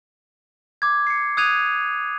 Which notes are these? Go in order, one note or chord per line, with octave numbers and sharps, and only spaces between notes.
D6 G#6
C7 C#7
D#6 F#6 G#6 D#7 F7